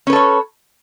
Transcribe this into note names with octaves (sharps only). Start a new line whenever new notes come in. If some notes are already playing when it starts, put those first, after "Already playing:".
C#4 A4 B4 C#5